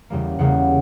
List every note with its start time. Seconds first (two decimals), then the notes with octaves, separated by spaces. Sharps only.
0.10 E2 C#3 G3 A#3
0.39 E2 C#3 G3 A#3 F#5